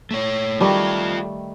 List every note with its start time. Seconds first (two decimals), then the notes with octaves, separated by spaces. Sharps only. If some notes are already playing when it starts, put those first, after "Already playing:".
0.11 A3 C#5
0.60 D#3 G3 A3 F4 A4